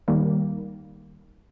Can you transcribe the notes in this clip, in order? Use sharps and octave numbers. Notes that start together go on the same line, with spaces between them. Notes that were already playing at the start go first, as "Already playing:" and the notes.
D#2 D#3 G3 A#3